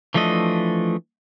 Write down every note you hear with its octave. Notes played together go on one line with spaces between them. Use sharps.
E3 F3 A3 D4 D#5